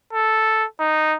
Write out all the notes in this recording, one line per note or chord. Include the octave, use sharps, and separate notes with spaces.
A4
D#4